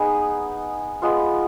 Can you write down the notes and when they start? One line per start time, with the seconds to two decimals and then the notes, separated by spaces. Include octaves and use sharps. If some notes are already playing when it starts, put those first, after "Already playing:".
Already playing: B3 D#4 G#4
1.02 G#3 B3 F4